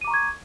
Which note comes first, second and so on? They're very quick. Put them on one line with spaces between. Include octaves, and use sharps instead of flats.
D#7 D6 A#5 C#6 G#6